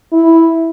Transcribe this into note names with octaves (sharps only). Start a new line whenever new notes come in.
E4